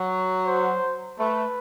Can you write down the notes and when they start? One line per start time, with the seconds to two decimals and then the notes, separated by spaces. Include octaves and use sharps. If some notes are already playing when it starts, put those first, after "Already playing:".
Already playing: F#3
0.47 C5
1.18 A3 B4